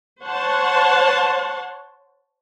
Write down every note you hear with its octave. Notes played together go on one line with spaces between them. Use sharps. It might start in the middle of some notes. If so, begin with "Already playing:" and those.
C5 C#5 F#5 A5 C6